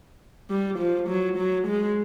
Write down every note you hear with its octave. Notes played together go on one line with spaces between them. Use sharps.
G3
F3
F#3
F#3
G#3